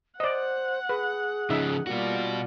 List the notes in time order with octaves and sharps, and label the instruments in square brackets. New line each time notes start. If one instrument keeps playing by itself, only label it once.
[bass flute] C5 [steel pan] D5 D#5 [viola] F#5
[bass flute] G#4 [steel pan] B4
[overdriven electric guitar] C#3 F3 [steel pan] D#4 E5
[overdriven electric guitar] B2 F#4 [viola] G3 F4 [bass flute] A#3